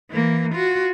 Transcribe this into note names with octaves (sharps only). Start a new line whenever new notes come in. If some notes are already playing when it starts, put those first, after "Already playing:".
E3 A#3
F4 F#4